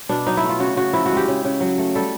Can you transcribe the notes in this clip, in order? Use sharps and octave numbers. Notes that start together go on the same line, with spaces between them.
B2 D4
F#3 D#4
E4
A3
F4
C#3 F#4
C#3 F#4
F3 E4
F#4
G#3
G4
C#3
C#3
F#3
A3
G3 A4